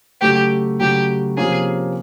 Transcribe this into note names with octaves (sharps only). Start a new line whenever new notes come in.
C#3 F#3 A3 G4
C#3 F#3 A3 G4
C3 F3 A#3 C#4 G#4